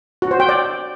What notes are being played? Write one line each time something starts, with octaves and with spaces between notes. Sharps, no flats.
F#4
C5
G5
D5